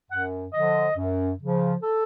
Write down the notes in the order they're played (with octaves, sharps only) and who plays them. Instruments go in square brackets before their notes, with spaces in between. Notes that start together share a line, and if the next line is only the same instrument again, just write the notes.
[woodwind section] F#2 F#5
D3 F3 D#5
F#2
C#3 F3
A4